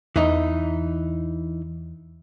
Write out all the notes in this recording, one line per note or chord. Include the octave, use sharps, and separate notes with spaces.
E2 E3 D#4